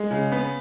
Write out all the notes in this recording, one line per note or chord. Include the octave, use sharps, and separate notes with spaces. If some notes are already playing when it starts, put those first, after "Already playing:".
Already playing: G#3
C#3
B3